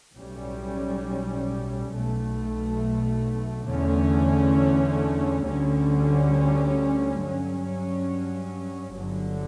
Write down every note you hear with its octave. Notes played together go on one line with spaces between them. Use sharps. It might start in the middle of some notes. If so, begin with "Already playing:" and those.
B1 A2 G3 C#4
B1 B2 A3
E2 D3 A3 C#4
D2 D3 G3 C#4
G2 F#3 C#4
G1 G2 D3 F#3